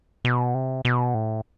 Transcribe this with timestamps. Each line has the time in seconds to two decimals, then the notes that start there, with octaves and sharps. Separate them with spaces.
0.25 B2
0.55 C3
0.85 B2
1.14 A2